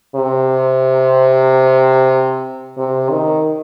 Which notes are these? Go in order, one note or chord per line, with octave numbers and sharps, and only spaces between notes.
C3
C3
D#3